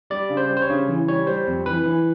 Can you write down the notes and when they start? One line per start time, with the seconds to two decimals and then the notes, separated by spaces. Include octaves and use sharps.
0.10 G3 D5
0.30 C#3
0.37 C5
0.49 G3
0.57 C5
0.62 C#5
0.69 C#3
0.89 E3
1.08 G3 C#5
1.27 G3 C5
1.47 F2
1.66 E3 B4
1.85 E3